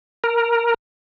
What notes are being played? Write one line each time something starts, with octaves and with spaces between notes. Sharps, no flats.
A#4